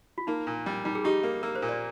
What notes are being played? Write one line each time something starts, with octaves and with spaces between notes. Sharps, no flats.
F4
A#3 D#4
A#2
G3
G3 D#4
G#4
D#4 G4
A#3
A#3 A#4
C5
A#2
D5